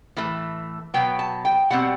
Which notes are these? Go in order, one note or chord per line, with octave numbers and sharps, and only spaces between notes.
A2 E3 A3
B2 F#3 B3 G5
A5
G5
B2 G3 C4 F#5